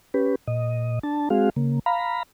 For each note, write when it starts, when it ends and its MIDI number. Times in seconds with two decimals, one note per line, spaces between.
0.14 0.35 61
0.14 0.35 67
0.14 0.35 71
0.47 0.99 46
0.47 0.99 75
1.03 1.29 62
1.03 1.29 81
1.30 1.50 56
1.30 1.50 60
1.30 1.50 66
1.30 1.50 68
1.30 1.50 77
1.56 1.79 49
1.56 1.79 58
1.86 2.23 77
1.86 2.23 82
1.86 2.23 83